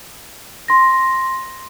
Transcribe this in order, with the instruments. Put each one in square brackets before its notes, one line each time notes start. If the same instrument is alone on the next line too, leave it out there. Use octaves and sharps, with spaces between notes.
[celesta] C6 A#6